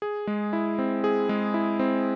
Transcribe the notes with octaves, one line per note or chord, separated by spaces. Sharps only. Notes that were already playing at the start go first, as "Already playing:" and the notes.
G#4
G#3
E4
C4
G#4
G#3
E4
C4